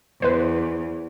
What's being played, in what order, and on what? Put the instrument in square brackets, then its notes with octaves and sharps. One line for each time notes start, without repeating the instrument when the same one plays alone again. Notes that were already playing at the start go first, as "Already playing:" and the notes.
[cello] E2 [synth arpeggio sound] B4 C5